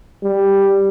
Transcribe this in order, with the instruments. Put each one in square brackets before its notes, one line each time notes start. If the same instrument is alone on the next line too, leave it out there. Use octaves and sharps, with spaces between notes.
[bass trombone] G3